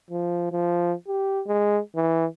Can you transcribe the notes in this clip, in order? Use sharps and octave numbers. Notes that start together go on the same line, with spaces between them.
F3
F3
G4
G#3
E3